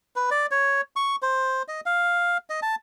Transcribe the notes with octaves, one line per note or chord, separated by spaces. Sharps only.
B4
D5
C#5
C#6
C5
D#5
F5
D#5
A5